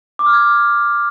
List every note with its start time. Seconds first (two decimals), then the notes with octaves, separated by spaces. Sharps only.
0.19 D6
0.26 F6
0.33 G#6